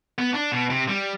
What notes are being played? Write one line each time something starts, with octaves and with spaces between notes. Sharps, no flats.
B3
D4
B2
C3
G3